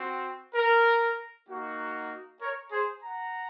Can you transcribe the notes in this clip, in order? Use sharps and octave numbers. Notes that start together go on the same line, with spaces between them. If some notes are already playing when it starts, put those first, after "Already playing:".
Already playing: C4 F#4
A#4
A#3 D#4 F#4
A#4 C#5
G#4 C5
F#5 A#5